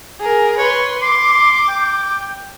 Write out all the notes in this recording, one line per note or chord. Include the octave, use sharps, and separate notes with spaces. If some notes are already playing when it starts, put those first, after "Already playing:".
G#4 A#4
B4 C#5 C6
C6 D6
G5